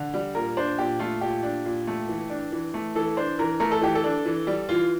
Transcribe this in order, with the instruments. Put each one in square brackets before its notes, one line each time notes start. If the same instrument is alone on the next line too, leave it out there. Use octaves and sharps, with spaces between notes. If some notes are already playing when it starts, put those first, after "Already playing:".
Already playing: [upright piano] D3
G3
A#2 A#4
D4 C5
A#2 G4
A3 F4
A#2 G4
D4
A#2
A3
E3
D4
E3
A3
E3 A4
D4 C5
E3 A#4
A3 A#4
A4
E3 G4
A4
D4
E3
G3
E3 F4